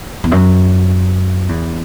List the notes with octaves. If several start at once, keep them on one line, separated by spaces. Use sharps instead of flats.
E2
F#2
E2